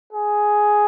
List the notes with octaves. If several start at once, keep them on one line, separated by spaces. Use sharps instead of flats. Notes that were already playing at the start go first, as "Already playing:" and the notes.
G#4